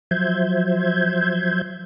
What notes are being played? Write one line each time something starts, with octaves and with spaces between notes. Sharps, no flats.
F3 F#3 C5 E5 G6 G#6